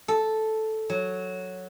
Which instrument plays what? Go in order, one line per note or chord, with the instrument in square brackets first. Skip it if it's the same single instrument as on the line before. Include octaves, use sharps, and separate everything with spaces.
[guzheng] A4
F#3